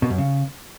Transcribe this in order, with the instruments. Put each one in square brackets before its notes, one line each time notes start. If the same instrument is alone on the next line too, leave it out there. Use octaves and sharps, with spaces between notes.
[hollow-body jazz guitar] B2
F#2
C#3